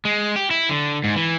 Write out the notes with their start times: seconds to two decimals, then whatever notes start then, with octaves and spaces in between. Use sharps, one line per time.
0.05 G#3
0.36 G4
0.51 E4
0.69 D3
1.04 G#2
1.16 E3